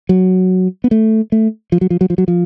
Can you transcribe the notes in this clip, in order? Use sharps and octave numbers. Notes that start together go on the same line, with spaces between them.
F#3
B3
A3
A3
F3
F#3
F3
F#3
F3
F#3
F3